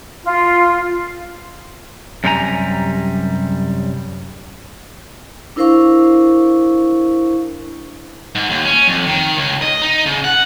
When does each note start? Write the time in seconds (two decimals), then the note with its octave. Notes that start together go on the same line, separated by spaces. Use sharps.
0.24 F4
2.24 F#2 C3 G3 A#4 G#5 A#5
5.56 D4 E4 A#4 C5 F5 C#6
8.35 G#2
8.50 D#2
8.65 C#4
8.88 F2
9.07 D#3
9.37 C#2
9.62 D#5
9.82 D#4
10.06 C#3
10.24 F#5